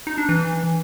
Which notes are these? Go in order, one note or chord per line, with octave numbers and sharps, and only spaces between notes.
D#4
D4
E3